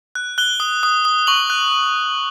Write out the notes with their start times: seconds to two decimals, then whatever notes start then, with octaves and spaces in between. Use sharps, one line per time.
0.15 F#6
0.38 F#6 G7
0.60 D#6
0.83 D#6
1.05 D#6
1.27 C#6 F#7
1.50 F#6